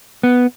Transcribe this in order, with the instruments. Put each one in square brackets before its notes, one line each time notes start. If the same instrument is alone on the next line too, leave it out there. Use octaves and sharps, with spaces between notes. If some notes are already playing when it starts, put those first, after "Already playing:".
[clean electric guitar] B3